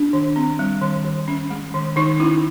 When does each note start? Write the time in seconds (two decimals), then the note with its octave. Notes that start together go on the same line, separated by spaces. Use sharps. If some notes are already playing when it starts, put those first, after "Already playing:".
Already playing: D4
0.13 D#3
0.36 C4
0.59 G3
0.81 D#3
1.05 D#3
1.28 C#4
1.51 G#3
1.74 D#3
1.96 D#3 D#4
2.20 C#4 E4